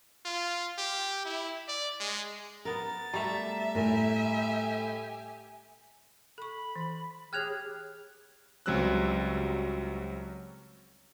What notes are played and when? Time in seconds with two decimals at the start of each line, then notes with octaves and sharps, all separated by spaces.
0.25 F4
0.78 G4
1.25 E4
1.68 D5
2.00 G#3
2.65 B3 A#4 A6
3.14 G3 A3 E5 A#5 F7
3.75 A2 G4 A#4 G#5
6.38 A4 B5 C#6
6.76 E3
7.33 G4 G#4 C#5 G5 F6 F#6 G#6 F7
8.66 C#2 F#3 G3 C4 E6 F#6